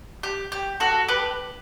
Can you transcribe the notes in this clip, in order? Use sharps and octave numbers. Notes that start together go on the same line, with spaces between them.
G4
G4
F#4 A4
G4 B4